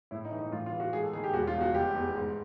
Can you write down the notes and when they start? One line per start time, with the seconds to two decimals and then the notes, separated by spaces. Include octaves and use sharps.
0.11 A2 E4
0.25 D#4
0.32 E3
0.39 D#4
0.52 A2 F4
0.66 F4
0.72 E3
0.80 F#4
0.93 G#2 G#4
1.03 A4
1.13 D#3 G#4
1.24 G4
1.33 E1 F#4
1.47 F4
1.55 E2
1.61 F#4
1.74 F1 G4
1.95 E2
2.15 G#2